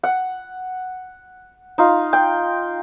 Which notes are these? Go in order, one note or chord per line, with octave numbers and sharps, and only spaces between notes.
F#5
D#4 F4
G5